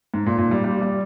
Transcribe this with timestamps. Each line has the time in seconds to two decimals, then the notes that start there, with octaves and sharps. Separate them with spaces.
0.14 G#2
0.26 A#2
0.38 A#2
0.51 G3
0.64 G3
0.81 G3